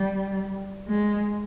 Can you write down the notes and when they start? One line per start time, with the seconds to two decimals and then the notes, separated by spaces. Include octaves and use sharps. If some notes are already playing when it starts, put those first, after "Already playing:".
Already playing: G3
0.88 G#3